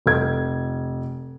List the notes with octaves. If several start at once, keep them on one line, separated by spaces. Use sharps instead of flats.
F1 G#6